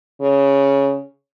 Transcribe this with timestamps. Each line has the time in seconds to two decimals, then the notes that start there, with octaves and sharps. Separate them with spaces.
0.21 C#3